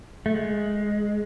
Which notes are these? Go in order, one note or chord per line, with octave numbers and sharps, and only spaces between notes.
A3
G#3